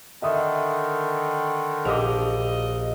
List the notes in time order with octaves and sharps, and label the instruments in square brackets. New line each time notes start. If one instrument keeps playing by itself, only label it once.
[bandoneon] D3 D#3 [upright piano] D#5 E5 D#6
[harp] A#1 F#4 G4 [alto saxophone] D#5 [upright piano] D6 D#6 F7